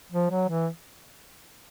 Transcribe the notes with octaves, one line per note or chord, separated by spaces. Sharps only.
F3
F#3
E3